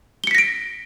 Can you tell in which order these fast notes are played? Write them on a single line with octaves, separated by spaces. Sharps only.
G7 C#7 B6 A#6 D7